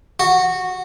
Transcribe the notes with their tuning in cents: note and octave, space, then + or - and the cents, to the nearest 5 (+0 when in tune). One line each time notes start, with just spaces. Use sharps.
F#4 -10